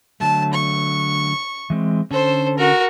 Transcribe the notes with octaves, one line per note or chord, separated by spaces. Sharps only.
D3 F#3 A3 A5
C#6
E3 G#3 C4
D3 C#4 A4 C5
F#4 A#4